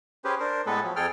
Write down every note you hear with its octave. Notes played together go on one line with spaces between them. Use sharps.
C#4 G4 G#4 B4 C5
D4 A#4 C5
A2 G#3 B3 A4 B4
F3 F#3
F2 G#4 A4 G5 F6